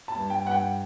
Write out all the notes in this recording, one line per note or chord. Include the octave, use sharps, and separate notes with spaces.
A5
G2
G5
G2 F#5
G5